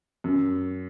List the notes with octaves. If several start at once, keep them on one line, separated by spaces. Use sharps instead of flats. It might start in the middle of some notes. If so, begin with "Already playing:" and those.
F#2